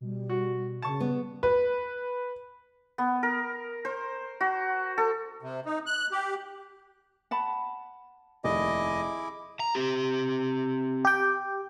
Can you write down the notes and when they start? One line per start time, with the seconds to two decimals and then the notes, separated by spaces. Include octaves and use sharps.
0.01 B2 G3
0.30 F#4
0.82 C#3 A5 C#6
1.00 G3 B3
1.43 B4
2.98 B3
3.23 A#4
3.85 C5
4.41 F#4
4.98 A4
5.43 C3
5.65 D#4
5.86 F#6
6.12 G4
7.31 F#5 A5 B5
8.44 F1 D#2 E4 G#4 D#5 D6
9.60 A#5
9.75 C4 G4
11.05 G4 G5